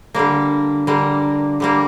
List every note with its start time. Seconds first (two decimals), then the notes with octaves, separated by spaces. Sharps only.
0.14 D3 G3 A#3
0.87 D3 G3 A#3
1.60 D3 G3 A#3